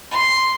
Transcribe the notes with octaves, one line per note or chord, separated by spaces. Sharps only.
C6